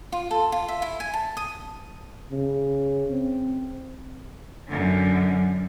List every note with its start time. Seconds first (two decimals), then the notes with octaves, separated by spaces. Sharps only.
0.12 F4
0.31 A4
0.52 F4
0.68 E5
0.82 E4
1.00 G#5
1.14 A5
1.37 D#6
2.31 C#3
3.11 C4
4.68 F#2 D3